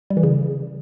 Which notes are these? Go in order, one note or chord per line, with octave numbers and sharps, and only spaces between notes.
G3
E3
C#3